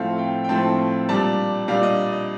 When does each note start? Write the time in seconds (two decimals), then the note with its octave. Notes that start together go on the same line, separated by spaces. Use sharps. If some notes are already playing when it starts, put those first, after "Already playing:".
Already playing: A2 F3 A3 C4 F5
0.18 G5
0.44 G5
0.49 A2 F3 A3 C4 A5
1.09 A#2 G3 D4 A5
1.68 A#2 G3 D4 F5
1.83 D#5
2.13 D#5